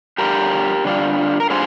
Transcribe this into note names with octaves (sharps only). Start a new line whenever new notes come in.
D3 G3 D4 F4 G4 A#4
D3 G3 D4 F4
A#4
D3 G3 D4 F4 G#4 C5